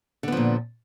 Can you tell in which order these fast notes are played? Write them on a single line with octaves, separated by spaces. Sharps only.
D3 B3 F3 A#2